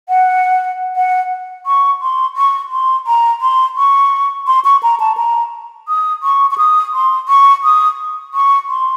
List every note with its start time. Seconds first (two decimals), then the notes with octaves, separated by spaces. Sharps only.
0.09 F#5
0.96 F#5
1.66 C#6
2.02 C6
2.36 C#6
2.72 C6
3.07 A#5
3.41 C6
3.77 C#6
4.47 C6
4.64 C#6
4.83 A#5
5.00 A5
5.17 A#5
5.88 D#6
6.23 C#6
6.51 C#6
6.58 D#6
6.94 C6
7.28 C#6
7.64 D#6
8.34 C#6
8.68 C6